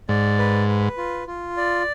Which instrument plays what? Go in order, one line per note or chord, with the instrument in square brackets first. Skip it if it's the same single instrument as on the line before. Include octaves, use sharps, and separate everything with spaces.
[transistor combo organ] G#2 [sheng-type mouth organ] D5
[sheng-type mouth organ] B4
B4
F4
F4
D5